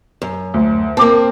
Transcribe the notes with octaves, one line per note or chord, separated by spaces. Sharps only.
F#2
D2
A#3 C4 A5 D6